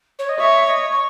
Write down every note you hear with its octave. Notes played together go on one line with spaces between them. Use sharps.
C#5
D#5
C#5 E5
D#5
C#6